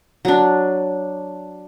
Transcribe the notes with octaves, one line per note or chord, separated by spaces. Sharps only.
F#3 D4